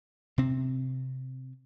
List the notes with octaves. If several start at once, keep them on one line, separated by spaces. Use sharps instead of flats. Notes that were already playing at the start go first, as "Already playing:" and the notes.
C3 C4